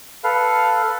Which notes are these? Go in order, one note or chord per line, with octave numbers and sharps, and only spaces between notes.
A4 B4 F5